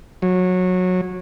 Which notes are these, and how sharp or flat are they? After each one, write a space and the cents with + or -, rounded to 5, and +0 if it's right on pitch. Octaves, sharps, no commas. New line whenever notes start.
F#3 -20